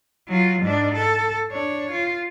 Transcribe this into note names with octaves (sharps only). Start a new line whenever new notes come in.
F#3 F4
G#2 D4
A4
D4 C#5
F4